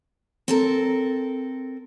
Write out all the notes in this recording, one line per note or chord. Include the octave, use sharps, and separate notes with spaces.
C4 A4 A#4